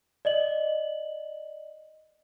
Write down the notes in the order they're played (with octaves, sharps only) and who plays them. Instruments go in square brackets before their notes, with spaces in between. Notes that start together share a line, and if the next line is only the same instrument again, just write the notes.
[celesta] D5 D#5 F#7